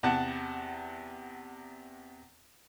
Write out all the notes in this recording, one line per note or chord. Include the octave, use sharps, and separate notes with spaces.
E2 C3 F#5 A5